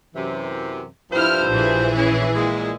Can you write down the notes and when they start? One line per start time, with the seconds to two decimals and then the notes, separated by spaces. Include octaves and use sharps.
0.15 F#2 C3 E3
1.12 G2 F3 E4 C5 F6
1.49 A#1 E3 G#4
1.96 C#4 E4
2.35 A#2 G#3 E4